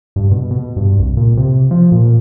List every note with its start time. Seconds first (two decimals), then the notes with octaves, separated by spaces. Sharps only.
0.16 G2
0.31 B2
0.51 B2
0.76 G2
0.99 C2
1.17 A#2
1.37 C3
1.71 F3
1.92 A#2